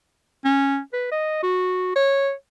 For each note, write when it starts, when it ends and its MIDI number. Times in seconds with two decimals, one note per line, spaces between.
0.45 0.79 61
0.94 1.09 71
1.12 1.39 75
1.43 1.95 66
1.96 2.32 73